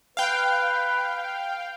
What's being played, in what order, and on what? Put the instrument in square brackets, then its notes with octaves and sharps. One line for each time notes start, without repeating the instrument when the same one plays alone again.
[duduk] B4 [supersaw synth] F5 G5